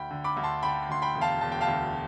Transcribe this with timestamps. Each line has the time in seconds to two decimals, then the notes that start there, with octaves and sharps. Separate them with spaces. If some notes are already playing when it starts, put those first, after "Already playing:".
Already playing: D2 G5 B5
0.11 D3
0.24 B5 D6
0.37 D2
0.43 A5 C6
0.63 D3 G5 B5
0.89 D2 C6
1.02 G5 B5
1.15 E1
1.21 F5 A5
1.41 E1 A5
1.52 G5
1.61 F5 A5
1.67 D2